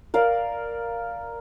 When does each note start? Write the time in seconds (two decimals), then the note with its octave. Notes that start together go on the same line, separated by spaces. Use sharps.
0.14 A#4 D5 F5